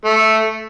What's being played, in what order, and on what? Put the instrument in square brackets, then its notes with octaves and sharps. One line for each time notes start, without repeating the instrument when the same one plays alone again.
[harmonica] A3